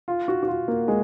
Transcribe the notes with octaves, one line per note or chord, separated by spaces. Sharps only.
F4
F#4
F#4
F4
A#3
G#3